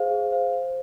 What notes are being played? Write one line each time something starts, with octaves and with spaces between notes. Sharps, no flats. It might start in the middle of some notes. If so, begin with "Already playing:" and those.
Already playing: G#4 C5 F5
G#4
C5 F5
C5